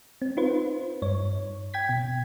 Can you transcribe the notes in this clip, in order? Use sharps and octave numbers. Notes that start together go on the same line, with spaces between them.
C4
D#4 F4 B4 C5
G2 C#5
G5 G#6 B6
B2